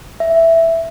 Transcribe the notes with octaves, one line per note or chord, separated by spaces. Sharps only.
E5